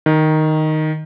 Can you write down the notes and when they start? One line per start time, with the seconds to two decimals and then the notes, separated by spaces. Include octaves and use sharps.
0.06 D#3